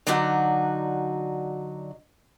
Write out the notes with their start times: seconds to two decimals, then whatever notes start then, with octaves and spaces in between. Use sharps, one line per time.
0.07 D3 F#3 D4 D#4 F#4